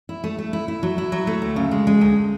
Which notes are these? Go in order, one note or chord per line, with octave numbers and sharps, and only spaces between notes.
E4
A3
A3
E4
E4
F#3
E4
F#3
A3
D2
C#3
G#3
G#3
D2